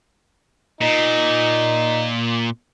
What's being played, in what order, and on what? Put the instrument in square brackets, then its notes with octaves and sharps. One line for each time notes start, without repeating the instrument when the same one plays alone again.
[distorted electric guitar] A#2 [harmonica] D#4